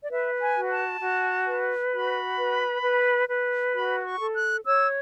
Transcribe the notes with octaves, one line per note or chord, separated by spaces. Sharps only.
D5
B4 E5
G#5
F#4
A5
F#4
B4
F#4 B5
B4
B4
B4
F#4 B5
C#6
A4
F#6
C#5 E6